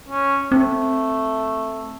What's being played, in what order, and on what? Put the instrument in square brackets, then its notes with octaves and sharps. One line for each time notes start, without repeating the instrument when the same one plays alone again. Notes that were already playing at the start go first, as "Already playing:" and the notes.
[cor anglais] C#4
[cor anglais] A3 [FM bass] C4